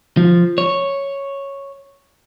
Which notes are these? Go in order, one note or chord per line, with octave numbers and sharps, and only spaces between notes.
F3
C#5